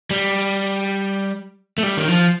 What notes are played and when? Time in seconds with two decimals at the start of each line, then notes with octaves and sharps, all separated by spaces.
0.11 G3
1.78 A3
1.83 G3
1.97 D#3
2.08 F3